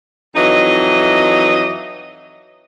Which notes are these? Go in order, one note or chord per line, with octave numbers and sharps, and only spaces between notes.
F2 E3 F#3 D#4 D#5